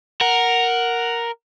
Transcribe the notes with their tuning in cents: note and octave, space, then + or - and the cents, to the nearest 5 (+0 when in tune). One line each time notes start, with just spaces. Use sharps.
A#4 +0 F#5 +0